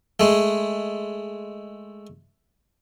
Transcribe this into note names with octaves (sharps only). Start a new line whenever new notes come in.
G#3 A3